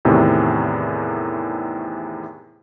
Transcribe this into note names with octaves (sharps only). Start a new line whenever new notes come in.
E2 A2 C3 D#3